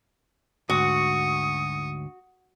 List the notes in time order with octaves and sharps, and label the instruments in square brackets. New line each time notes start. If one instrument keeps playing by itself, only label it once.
[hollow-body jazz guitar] D2 G#2 [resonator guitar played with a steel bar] F#4 [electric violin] C#6 D#6